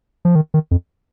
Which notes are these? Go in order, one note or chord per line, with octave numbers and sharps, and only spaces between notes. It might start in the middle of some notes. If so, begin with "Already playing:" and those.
F3
D#3
D#3
F2